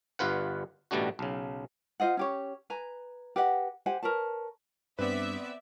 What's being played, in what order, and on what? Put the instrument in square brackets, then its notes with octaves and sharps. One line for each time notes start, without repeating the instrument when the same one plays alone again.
[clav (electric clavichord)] G1 G2 F4 B4 F#5
A1 B2 G3 A3 D4 F#4
B1 C#3
[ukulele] F4 C5 D#5 F#5
C#4 G4 C#5
B4 G#5 A#5
G4 B4 D#5 F#5
G4 C5 F#5 G#5
A#4 B4 C#5 A5
[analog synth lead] G2 [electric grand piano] B3 C4 B4 [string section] D5 E5